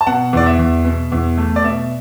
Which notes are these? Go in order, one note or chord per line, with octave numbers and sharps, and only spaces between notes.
A5
B2 F#5
E2 D5
E5
E2
B2
E2
A3
D5
B2 E5